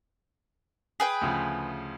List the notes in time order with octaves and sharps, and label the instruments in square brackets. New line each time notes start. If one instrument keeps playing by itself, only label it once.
[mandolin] G#4 B4 G5
[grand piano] D2 C#3 F3